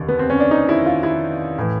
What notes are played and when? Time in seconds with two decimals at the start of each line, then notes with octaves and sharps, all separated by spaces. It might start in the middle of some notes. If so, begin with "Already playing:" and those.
Already playing: F1 D#2 D3
0.09 B3
0.19 C4
0.30 C#4
0.40 D4
0.51 D#4
0.69 E4
0.86 F4
1.03 E4
1.58 A2 E3